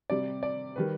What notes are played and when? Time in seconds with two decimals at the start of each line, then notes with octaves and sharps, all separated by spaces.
0.10 C3 G3 D5
0.43 D5
0.76 D#3 G3 B4